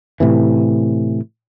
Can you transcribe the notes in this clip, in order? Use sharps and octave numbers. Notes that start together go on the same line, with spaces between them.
A2 C3 E3